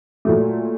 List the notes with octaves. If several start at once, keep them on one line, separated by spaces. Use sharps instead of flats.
A#2 F#3 A3